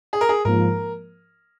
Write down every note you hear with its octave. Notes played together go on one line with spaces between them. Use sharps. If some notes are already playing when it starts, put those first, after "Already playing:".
G#4
A#4
G#4
G#2 F3 A#3 A#4